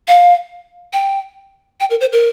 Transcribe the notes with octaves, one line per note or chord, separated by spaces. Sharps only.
F5
G5
G5
A#4
C5
A#4